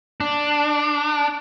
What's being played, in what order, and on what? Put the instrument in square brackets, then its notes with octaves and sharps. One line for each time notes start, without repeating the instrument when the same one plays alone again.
[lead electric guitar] D4